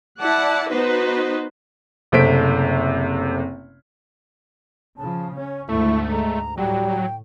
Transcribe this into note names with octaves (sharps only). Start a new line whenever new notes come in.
E4 D5 F#5 A5
B3 D#4 F#4 B4 C5
F#1 C3 A3 C5 B6 D7
C#3 F3 A5
C#4 C#5
D2 G#2 D3 A3 E4 C#6
G#3 A#5
A2 F#3 G3 G5